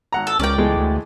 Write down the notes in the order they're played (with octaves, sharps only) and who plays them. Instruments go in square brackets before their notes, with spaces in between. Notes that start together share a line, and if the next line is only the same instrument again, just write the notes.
[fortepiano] G#1 F#5 A#5
[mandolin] A4
[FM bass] C#2 [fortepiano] C#4 A#4 [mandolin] D5 G5
[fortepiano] E3 G#3 A3
[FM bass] D2